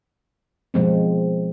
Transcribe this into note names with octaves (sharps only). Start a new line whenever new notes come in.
B2 F3 G#3 C4